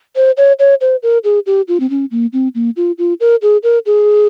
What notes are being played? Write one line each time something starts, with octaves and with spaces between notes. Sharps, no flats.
C5
C#5
C#5
C5
A#4
G#4
G4
F4
C4
C#4
A#3
C4
A#3
F4
F4
A#4
G#4
A#4
G#4